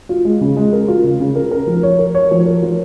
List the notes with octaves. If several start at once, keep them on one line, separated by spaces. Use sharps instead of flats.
F4
G#3
C#3
G#3
A#4
F4
C#3
C#3
A#4
A#4
F3
C#5
A#4
C#5
F3
A#4
F3